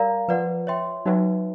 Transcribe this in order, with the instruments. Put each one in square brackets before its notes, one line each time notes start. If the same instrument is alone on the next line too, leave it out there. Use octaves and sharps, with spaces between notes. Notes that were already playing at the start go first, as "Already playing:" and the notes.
Already playing: [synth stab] G3 [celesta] A#4 D5 F5 A#5
[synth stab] F3 [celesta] B4 D5 F#5
[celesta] C#5 E5 G5 C6
[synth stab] F#3 [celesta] D#4 F#4 B4 E5 G5